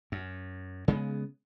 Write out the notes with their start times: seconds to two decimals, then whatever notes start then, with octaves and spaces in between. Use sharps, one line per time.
0.12 F#2
0.88 C#3 G#3 B3